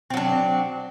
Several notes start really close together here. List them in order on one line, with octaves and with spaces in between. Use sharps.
C4 F#3 D4